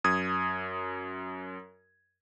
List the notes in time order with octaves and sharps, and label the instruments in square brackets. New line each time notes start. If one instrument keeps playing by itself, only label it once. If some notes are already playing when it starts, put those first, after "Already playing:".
[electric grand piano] F#2 D#6 G#6